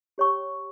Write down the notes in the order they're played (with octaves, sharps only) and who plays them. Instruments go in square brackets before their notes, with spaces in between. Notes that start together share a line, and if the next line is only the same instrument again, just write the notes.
[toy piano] G4 C#5 G5 C#6